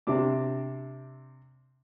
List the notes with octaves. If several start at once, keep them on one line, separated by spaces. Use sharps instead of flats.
C3 C4 D4 D6